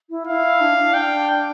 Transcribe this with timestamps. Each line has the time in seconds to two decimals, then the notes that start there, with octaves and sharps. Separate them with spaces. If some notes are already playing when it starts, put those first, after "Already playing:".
0.10 E4
0.27 E4 F5
0.61 D4
0.78 D4
0.94 D4 G5